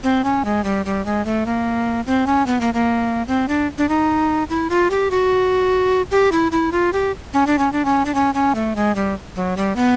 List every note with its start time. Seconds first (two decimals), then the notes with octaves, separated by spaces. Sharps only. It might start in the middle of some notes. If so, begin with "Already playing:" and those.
0.03 C4
0.24 C#4
0.45 G#3
0.64 G3
0.85 G3
1.06 G#3
1.25 A3
1.46 A#3
2.06 C4
2.27 C#4
2.46 B3
2.61 A#3
2.74 A#3
3.28 C4
3.48 D4
3.78 D4
3.89 D#4
4.50 E4
4.70 F4
4.90 G4
5.11 F#4
6.11 G4
6.32 E4
6.52 E4
6.72 F4
6.93 G4
7.33 C#4
7.47 D4
7.59 C#4
7.72 D4
7.85 C#4
8.05 D4
8.15 C#4
8.34 C#4
8.55 A3
8.76 G#3
8.95 G3
9.36 F#3
9.57 G3
9.76 B3